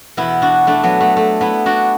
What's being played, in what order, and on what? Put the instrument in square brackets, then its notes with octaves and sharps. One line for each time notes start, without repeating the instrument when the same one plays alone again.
[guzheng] E2 B2 B3 E4
D4 F#4
A3 D4
F#3 B3
A3
A3
B3 E4
D4 F#4